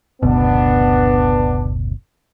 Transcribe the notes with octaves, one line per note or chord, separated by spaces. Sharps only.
F#1 D2 B2 B3 D4